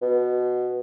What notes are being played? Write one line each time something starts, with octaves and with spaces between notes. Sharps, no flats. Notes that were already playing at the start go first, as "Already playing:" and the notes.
B2